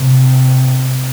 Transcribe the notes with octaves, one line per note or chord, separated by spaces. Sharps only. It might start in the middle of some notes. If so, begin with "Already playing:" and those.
Already playing: C3